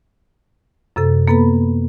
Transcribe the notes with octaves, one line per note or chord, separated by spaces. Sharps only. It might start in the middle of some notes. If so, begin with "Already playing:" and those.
F#2 C3 A4
A#3 B3 A4 B4 B5